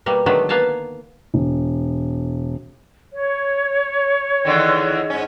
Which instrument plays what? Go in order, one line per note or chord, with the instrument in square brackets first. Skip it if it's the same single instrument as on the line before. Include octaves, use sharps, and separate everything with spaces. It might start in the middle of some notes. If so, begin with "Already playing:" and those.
[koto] B2 G3 A#3
D3 D#3 F#3 G#3 A3 B3
A#3 B3 F5 G#5 A5
[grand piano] E1
[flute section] C#5
[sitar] E2 D3 D#3
G#2 C#4